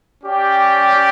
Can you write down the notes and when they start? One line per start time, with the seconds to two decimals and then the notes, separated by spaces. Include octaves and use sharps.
0.24 C#4 G4 D5 G5